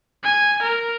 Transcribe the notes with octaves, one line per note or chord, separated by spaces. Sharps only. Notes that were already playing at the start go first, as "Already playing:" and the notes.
G#5
A#4